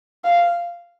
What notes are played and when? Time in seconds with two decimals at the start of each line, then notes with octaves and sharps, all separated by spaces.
0.24 F5